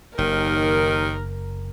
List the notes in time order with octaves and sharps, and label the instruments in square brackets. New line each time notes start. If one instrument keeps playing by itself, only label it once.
[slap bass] F#1 [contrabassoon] D#2 [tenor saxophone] D#3 [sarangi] A#4